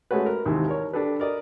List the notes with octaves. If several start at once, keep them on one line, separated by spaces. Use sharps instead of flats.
G#3 A3 C#4 F#4 B4
A#4
D#2 G#2 C3 E3
A#4 C#5
D4 G4 A4 B4
A#4 D5 D#5